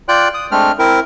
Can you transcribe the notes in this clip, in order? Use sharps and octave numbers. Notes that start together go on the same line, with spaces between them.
F4 D5 G5 F#6
D#6
G#3 A3 C4 D4 F6
C4 E4 A#4